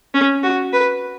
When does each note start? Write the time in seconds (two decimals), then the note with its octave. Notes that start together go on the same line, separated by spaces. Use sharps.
0.14 C#4
0.43 F#4
0.73 B4